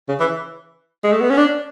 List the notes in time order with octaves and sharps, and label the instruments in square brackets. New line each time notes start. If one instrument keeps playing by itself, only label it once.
[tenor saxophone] C#3
E3
G#3
A3
B3
C#4
D4